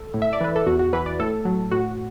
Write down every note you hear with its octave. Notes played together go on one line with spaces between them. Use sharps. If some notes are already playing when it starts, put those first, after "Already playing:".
Already playing: A4
A2
E5
D5
E3 B4
A4
E2 F#4
F#4
E3 B4
D5
A2 A4
F#3
A2 F#4